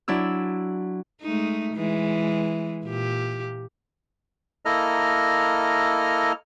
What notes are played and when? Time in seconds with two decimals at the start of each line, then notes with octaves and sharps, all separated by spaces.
0.08 F#3 D4 E4 E6
1.22 G#3 A3 D#4
1.75 E3 G#3
2.86 A#2 G4
4.65 A#3 E4 A4 D#5 A#5 F6